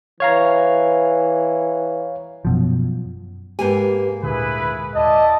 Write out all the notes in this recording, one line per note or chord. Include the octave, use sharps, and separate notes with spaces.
E3 C#5 F5 A#5
F#2 B2 F3
G#2 A#3 G4 B4 G#5
D2 A#2 D3 E4 G#4 B4
D#2 E4 D5 D#5 A5